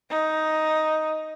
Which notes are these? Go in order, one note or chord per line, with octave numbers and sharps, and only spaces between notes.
D#4